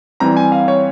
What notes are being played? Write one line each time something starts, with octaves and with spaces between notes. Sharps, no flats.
E3 G3 C4 A#5
G#5
F5
C#5